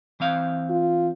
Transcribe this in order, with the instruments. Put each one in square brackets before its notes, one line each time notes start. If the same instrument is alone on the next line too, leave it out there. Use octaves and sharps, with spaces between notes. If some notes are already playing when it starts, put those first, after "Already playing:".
[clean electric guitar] E3 C4 F5
[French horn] F4